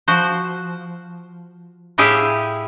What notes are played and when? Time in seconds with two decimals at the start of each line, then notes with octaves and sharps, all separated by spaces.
0.08 F3 F#4 C5
1.98 A2 E4 G4 G#4 F5